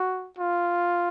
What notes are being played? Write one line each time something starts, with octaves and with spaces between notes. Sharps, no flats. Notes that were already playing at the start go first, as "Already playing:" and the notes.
Already playing: F#4
F4